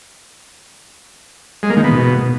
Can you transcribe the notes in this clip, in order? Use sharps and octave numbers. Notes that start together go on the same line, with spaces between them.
G#3
A#3
D#3
B3
B2